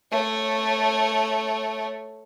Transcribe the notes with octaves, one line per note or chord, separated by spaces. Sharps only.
A3 C#5